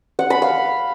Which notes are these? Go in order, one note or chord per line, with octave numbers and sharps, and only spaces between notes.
F#5
B5
F5